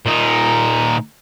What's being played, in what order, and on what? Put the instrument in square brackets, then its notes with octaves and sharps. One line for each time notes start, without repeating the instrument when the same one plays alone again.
[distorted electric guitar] A#2 D#4